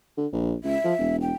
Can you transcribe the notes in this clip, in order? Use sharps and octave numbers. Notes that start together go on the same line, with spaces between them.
D3
A#1
C#2 E5
F3
E1
G5